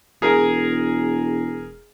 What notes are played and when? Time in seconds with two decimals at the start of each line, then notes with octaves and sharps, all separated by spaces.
0.22 E1 G#4 A#4